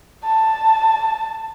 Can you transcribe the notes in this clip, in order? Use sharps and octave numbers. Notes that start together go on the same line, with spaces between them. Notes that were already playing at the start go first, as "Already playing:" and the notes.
A5